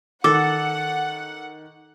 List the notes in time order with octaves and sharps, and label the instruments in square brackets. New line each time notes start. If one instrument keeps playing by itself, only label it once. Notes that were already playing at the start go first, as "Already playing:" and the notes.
[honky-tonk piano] D#3 [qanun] A4 [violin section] F#5 [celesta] D6